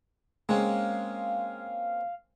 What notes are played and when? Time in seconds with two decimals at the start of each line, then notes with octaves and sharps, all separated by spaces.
0.49 G#3 A#3 C4 C#4 F5